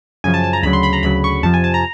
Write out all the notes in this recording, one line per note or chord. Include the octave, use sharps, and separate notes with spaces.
F#2 C#3 F3 G#5
A5
A5
A#5
D2 C#3 F#3 B5
C6
B5
A#5
D2 C#3 F#3 B5
C#6
F2 C3 F3 A5
G#5
A5
A#5